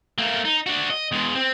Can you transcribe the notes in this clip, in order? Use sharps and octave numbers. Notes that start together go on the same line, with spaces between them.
A3 A#3
D#4
D4 F#4
D#5
E2 G#3
C4